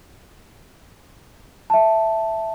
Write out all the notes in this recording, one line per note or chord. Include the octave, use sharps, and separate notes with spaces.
E5 A5